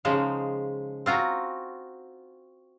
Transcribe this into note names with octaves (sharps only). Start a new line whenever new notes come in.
C#3 F3 G#3 D#4
C4 F4 F#4 A#5